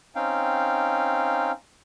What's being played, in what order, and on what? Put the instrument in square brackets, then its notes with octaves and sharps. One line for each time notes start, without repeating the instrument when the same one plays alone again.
[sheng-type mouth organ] C4 C#4 D#4 F5 G5